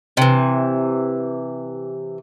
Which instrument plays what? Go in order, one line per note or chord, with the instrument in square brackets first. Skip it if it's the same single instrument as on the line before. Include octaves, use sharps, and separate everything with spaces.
[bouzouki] C3 E3